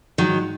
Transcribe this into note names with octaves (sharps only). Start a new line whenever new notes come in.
G#2 D#3 F#3